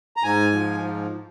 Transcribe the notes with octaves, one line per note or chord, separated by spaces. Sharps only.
A#5
G#2 G#5
F3
G#2